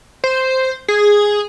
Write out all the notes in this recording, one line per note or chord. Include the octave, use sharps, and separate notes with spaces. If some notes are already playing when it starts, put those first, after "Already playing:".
C5
G#4